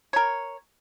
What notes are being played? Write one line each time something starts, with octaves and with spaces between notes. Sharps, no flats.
A#4 C#5